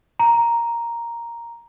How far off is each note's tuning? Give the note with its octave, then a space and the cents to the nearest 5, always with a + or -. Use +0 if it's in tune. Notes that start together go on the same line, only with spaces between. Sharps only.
A#5 +5